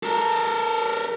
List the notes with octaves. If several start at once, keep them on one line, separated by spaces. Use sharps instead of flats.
A4 A#4